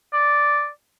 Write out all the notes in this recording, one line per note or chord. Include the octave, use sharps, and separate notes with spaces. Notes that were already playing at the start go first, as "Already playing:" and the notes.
D5